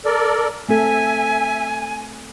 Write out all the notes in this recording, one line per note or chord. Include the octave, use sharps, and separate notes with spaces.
A4 A#4 D5
A3 C4 A4 E5 G#5